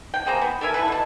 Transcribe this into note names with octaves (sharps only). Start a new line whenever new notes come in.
G5
A#3 G#4 C5 A#5
B3
A4 A#4 E5 G#5
E4 G#4 A4 B4
B2 A5